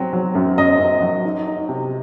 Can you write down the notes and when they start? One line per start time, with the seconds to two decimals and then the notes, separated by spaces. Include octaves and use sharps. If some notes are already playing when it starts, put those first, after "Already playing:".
Already playing: F#3 C4
0.13 F#3
0.35 F#2
0.58 F#2 D#5
0.79 F#2
1.02 F#3
1.25 D#4
1.47 D#4
1.69 C3